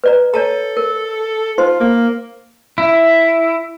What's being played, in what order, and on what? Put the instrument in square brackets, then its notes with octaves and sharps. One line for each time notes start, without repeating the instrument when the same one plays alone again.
[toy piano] B4 D5 A#5
[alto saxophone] A4 [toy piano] C#5 A5 A#5
[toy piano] A#4
[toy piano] D#4 C5 C6 [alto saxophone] F4
[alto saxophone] A#3
[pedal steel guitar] E4